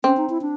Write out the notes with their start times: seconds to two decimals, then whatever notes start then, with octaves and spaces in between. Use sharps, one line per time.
0.04 C4 C#4
0.17 D#4
0.29 E4
0.42 D4